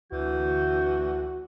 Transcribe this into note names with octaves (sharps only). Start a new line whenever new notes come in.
D2 E3 F#4 G6